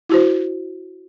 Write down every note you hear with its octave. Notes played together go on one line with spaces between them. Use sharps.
E4 F#4 C5